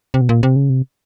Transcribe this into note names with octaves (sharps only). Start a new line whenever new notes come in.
C3
B2
A#2
C3
C#3
C3